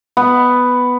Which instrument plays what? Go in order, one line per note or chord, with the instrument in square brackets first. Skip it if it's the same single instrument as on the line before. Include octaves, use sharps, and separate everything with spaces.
[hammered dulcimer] B3